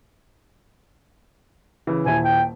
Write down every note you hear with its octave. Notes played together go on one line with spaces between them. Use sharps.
C#3 E3
D#1 E4 G#5
G5